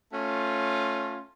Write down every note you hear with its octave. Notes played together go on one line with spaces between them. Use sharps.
A3 C#4 F4